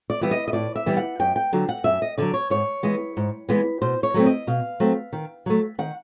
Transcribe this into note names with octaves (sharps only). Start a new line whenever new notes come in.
D5
E3 G3 B3 E5
D#5
D#5
A2 D5
E5
E3 G3 B3
F#5
F#2 G5
G5
D3 F#3
F#5
F#2 E5
D#5
D3 F#3 D5
C#5
G#2 C#5
E3 G#3 B3
G#2
E3 G#3 B3
B2 C5
C#5
F#3 A3 C4
D#5
B2 F5
F#3 A3 C4
D#3
F#3 A3
D#3 F#5